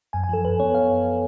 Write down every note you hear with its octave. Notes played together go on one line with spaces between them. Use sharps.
F#2 G#5
G#5
F3 A4
F#2 B4
B3 C#5
F5